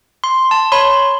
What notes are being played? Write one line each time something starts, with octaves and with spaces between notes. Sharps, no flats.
C6
A5
C#5 B5 C6